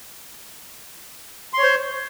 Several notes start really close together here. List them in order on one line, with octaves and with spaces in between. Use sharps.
C6 C#5 C5